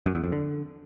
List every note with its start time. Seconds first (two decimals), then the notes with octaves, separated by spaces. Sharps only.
0.06 F#2
0.15 E2
0.24 F2
0.32 D3